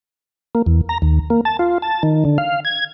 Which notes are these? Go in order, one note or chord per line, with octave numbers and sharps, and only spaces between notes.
A#3
E2
A#5
D#2
A#3
A5
F4
A5
D#3
D3
F5
G#6